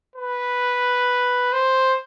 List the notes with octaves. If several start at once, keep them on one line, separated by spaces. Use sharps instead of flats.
B4
C5